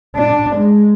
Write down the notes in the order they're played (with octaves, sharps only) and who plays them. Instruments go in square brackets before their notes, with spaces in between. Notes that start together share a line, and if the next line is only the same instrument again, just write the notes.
[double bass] D4
G#3